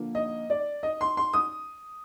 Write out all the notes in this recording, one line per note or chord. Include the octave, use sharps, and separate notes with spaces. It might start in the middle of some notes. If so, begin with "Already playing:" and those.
Already playing: D3 F3 A#3
D#5
D5
D#5
C6
C6
D#6